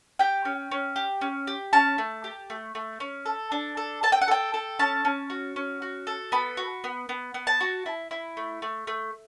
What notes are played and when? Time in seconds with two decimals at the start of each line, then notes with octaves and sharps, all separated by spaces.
0.19 G4 G5
0.45 C#4
0.71 C#4
0.96 G4
1.21 C#4
1.47 G4
1.73 C#4 A5
1.98 A3
2.24 G4
2.50 A3
2.75 A3
3.00 C#4
3.26 A4
3.52 D4
3.77 A4
4.03 A4 A5
4.12 G5
4.21 F#5
4.28 A4 G5
4.54 A4
4.79 C#4 A5
5.05 C#4
5.30 F#4
5.56 C#4
5.82 F#4
6.07 A4
6.32 B3 B5
6.57 F#4
6.84 B3
7.09 B3
7.34 B3
7.47 A5
7.61 F#4
7.86 E4
8.11 E4
8.37 A3
8.62 A3
8.87 A3